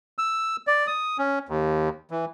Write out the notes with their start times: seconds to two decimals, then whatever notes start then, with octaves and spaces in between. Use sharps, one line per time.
0.18 E6
0.67 D5
0.87 D#6
1.18 C#4
1.49 D#2
2.11 E3